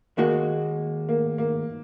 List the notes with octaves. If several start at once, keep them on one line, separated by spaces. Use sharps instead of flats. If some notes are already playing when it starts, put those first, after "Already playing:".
D#2 D#3 G#3 A#3 F#4
A#3
A#3